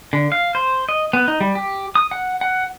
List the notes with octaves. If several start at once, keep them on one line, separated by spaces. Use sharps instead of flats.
D3
F5
C5
D#5
B3
D#4
G3
G4
D#6
F#5
F#5